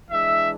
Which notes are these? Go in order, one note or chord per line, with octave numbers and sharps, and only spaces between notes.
E3 G#3 D4 E5